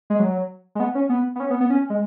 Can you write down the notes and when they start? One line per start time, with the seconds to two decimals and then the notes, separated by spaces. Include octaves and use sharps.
0.10 G#3
0.20 F#3
0.75 G#3
0.80 B3
0.95 C#4
1.09 B3
1.36 B3
1.40 C#4
1.50 B3
1.60 B3
1.70 C#4
1.90 G#3